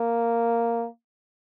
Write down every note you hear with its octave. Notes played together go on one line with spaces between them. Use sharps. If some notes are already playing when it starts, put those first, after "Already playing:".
Already playing: A#3